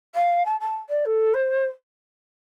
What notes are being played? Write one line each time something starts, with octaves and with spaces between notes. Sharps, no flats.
F5
A5
A5
D5
A4
C5